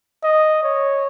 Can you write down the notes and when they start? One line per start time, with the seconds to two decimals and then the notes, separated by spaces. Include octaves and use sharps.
0.23 D#5
0.63 C#5